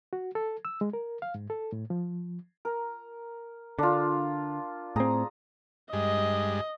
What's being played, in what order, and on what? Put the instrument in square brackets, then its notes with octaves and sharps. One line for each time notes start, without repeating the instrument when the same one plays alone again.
[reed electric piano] F#4
A4
E6
G#3
A#4
F5
G#2
A4
A2
F3
[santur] A#4
[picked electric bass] D3 [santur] D4 F4
[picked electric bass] A2 C4 [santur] G#4 A#5
[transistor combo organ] G2 G#3 [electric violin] D#5